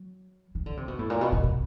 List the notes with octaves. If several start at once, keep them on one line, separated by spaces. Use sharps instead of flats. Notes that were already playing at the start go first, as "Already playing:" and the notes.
Already playing: F#3
D#3
D3
C3
B2
A2
A#2
B2
B2
B2